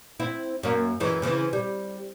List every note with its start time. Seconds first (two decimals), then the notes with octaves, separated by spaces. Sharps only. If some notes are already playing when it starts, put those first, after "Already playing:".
0.20 C4 E4
0.63 F#2 A#3
1.00 F#2 E3 G#3
1.22 C#3 E3 C4
1.53 G3